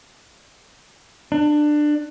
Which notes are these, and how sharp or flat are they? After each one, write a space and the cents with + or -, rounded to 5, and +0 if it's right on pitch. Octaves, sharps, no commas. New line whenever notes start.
D4 +20